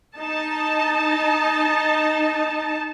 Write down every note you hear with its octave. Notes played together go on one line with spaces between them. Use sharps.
D#4 A5